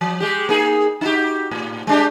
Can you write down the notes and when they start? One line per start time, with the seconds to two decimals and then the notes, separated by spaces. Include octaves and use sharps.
0.01 F3
0.20 G#3 G4
0.49 A#3 D#4 G#4
1.01 D#4 F#4 G4
1.51 A2
1.87 G#3 D4 G4